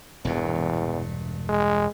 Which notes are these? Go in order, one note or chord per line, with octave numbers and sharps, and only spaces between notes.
E1 E2 G2 A#2
G#3